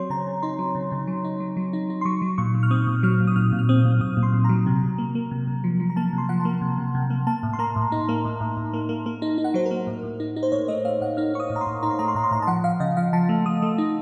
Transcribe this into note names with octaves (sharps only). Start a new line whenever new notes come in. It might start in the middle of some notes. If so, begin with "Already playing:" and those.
Already playing: F#3 C4 C#5 C6
C#3 A#5
C#3
D#4 C6
F#3
C#3
C#3
F#3
D#4
F#3
F#3
D#4
D#4
C6
F#3 C#6
F#3
A#2 C#6
A#2
F6
C4 D#6
A#2
F#3 F6
A#2
D#6
A#2 F6
A#2
F6
C4 D#6
A#2
A#2 D#6
A#2
C6
A#2
F#3 A#5
C3
C3
A#3
A#3
C3
C3
F3
F3
A#5
A#3 A5
C3
C6
F3 F#5
A5
A#3
C3
C3
C3
A#3
A#3 A5
A2
C6
A#3 A#5
A2
D#4
A#3
A2
A2
A2
A#3
A#3
A#3
D#4
D#4
F#5
F#3 C5
A#4
A#3
A2
A2
D#4
D#4
C5
A2 C#5
A3 D#5
A3 F5
A2 F#5
D#4 F6
D#4 C#6
D#6
A2
A#5
C6
A2
D#4 A#5
C6
A3 A#5
C6
A2 A#5
C6
A2 A#5
A5
F3 F#5
F3 F5
C#3 D#5
F3 F5
F3 A5
A3
A3 D#6
A3
D#4